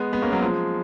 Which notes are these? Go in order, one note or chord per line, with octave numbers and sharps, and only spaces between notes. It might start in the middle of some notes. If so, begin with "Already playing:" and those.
Already playing: G#3 B3
G#3 B3
A#3 C#4
F#3 A#3
F3 G#3